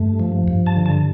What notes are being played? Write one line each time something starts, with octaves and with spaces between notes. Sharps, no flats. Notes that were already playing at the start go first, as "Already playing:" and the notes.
Already playing: G2 A3
F3
G2
A5
D3
A5